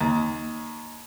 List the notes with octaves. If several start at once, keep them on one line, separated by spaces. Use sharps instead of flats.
D#2